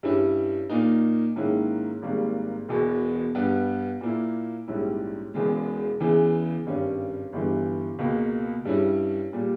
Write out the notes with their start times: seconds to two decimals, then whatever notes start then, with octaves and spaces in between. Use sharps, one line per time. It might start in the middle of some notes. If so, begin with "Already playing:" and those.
0.03 G2 G3 C#4 E4
0.70 A#2 A#3 D#4
1.36 G#2 D#3 A#3 C#4 E4
2.02 G#1 G#2 G3 A#3
2.69 E1 E2 B2
3.35 G2 G3 B3
4.01 A#2 A#3 E4
4.68 A#1 G#2 G3 C#4 E4
5.34 E1 E2 C#3 G#3
6.00 E2 C#3 E3
6.66 G#1 G2 G3 C#4
7.33 G1 G2 E3 G3
7.99 C#2 B2 A#3
8.65 G2 G3 C#4 E4
9.33 A#2 G3